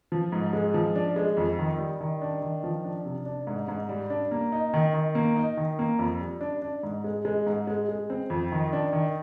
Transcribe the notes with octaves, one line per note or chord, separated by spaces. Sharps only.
F3
G#2
G#3
F3
D4
G#3
F2
D#3
G3
D#3
D4
D#3
F3
D4
C3
D4
G#2
G#2
G3
D4
A#3
D#4
D#3
D#3
A#3
D#4
D#3
A#3
F2
G3
D4
D4
G#2
G#3
G#3
G#2
G#3
G#3
C4
F2
D#3
D4
D#3